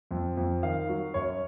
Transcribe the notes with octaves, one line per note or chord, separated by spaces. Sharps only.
F2
F2
D#3 F5
F#3
F#2 C#5